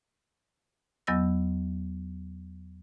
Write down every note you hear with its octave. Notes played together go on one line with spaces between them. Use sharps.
E2 F#3 B3 D#5 E6 A#6